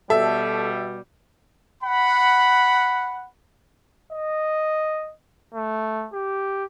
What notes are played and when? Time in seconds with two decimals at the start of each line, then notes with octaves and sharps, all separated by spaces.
0.10 B2 G3 A4 E5
1.83 F#5 B5
4.13 D#5
5.54 A3
6.13 G4